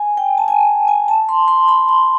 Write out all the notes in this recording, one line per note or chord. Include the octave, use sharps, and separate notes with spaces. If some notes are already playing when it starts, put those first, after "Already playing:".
Already playing: G#5
G5
A5
G#5
G#5
A5
C6
C6
B5
C6